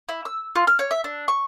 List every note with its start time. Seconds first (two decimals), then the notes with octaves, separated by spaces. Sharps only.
0.09 E4
0.25 E6
0.56 F4
0.67 F6
0.79 C#5
0.91 E5
1.04 D4
1.28 C#6